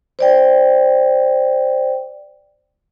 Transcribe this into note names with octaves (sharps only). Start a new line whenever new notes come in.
C5 D5 G5